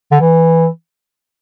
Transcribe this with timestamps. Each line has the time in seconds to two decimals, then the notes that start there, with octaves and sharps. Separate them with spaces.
0.11 D3
0.21 E3